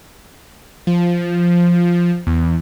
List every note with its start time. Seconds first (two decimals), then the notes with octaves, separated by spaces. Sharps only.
0.87 F3
2.27 E2